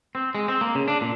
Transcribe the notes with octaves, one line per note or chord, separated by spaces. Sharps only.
C4
G#3
C4
A#3
C#3
D4
A#2